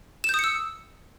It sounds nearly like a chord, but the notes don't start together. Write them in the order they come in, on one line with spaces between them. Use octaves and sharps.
E7 G6 D#6 C#7 E6